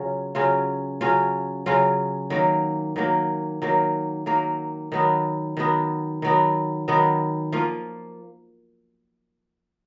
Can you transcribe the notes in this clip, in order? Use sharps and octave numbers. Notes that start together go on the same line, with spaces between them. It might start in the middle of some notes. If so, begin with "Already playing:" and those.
Already playing: C#3 F#3 C#4 F4
C#3 F#3 C#4 F4
C#3 F#3 C#4 F4
C#3 F#3 C#4 F4
D#3 F#3 A#3
D#3 F#3 A#3
D#3 F#3 A#3
D#3 F#3 A#3
D#3 F#3 B3
D#3 F#3 B3
D#3 F#3 B3
D#3 F#3 B3
F3 A#3 F4